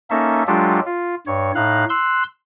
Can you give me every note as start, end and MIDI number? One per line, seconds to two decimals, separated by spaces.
0.10 0.43 58
0.10 0.43 61
0.10 0.43 63
0.10 0.43 69
0.10 0.43 76
0.47 0.80 54
0.47 0.80 56
0.47 0.80 62
0.47 0.80 65
0.47 0.80 67
0.47 0.80 69
0.86 1.15 65
1.27 1.52 43
1.27 1.52 73
1.55 1.85 45
1.55 1.85 63
1.55 1.85 77
1.55 1.85 90
1.90 2.23 84
1.90 2.23 88
1.90 2.23 90